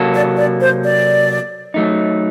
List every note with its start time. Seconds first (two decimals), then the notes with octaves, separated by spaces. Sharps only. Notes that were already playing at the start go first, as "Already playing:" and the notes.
Already playing: C3 F#3 A#3 F#4 A4
0.14 D5
0.37 D5
0.60 C5
0.83 D5
1.74 F#3 A3 D#4